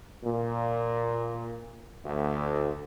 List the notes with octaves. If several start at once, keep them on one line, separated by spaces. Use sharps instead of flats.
A#2
D2